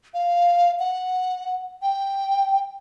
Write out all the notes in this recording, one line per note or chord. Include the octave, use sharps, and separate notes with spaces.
F5
F#5
G5